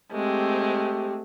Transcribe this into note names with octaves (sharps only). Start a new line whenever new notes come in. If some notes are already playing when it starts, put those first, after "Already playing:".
G#3 A3 C4 G4